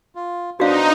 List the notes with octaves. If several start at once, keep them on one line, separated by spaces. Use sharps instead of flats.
F4
B2 D4 D#4 F#4 C5 F5